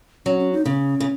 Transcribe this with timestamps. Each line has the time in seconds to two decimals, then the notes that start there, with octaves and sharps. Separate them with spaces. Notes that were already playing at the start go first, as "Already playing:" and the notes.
0.25 F#3 C#4
0.39 C#4
0.53 D#4
0.65 C#3 C#4
1.00 C#3